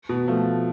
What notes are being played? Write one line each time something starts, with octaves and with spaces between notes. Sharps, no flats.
B2
F3 A3